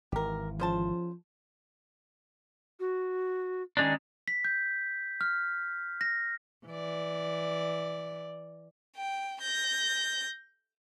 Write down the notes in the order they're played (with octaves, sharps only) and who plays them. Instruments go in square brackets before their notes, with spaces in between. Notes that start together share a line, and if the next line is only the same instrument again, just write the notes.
[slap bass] G#1 E3 [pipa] G4 A#4
[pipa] C#3 C5 A5 [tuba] F3
[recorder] F#4
[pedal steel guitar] D#3 G#3 D4 [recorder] C#4
[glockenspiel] B6
G6
F6
A#6
[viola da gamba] E3 D5
[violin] G5
G6 A#6